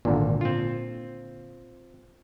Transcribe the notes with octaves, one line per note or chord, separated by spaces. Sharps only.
G#1 A#2 D3
C4 F4